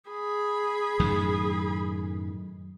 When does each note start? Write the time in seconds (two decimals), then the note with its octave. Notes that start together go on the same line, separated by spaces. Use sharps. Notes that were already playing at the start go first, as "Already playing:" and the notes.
0.10 G#4 B5
1.00 F#2 A2 D#3